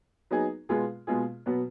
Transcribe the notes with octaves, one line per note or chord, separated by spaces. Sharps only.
F#3 B3 D#4 G#4
B2 G#3 B3 F4 G#4
B2 G#3 B3 F4 G#4
B2 F#3 B3 F#4